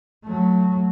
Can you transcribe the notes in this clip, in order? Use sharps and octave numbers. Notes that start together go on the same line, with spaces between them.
F#3 A3